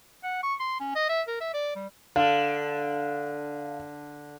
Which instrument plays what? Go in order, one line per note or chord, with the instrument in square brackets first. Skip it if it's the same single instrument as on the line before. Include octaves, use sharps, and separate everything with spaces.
[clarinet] F#5
C#6
C6
C#4
D#5
E5
A#4
E5
D5
G3
[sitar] D3 [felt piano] F5